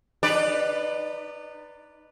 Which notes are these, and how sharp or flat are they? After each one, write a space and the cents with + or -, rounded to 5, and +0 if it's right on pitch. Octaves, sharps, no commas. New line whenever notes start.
D#4 -25 B4 +0 D5 +0